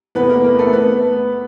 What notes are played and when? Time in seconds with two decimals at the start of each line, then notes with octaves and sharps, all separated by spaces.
0.15 E2 C3 E3 A3 B3 B4
0.29 A#3 A#4
0.44 A#3 A#4
0.59 A3 A4
0.73 B3 B4